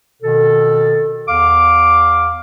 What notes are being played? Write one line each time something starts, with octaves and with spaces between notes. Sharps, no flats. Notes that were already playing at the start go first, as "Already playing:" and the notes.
B2 D#3 A4
E2 F5 D6